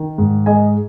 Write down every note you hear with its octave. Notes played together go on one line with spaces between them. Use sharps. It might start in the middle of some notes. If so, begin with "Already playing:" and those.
Already playing: D#3
G#2
G#3 D#5 G#5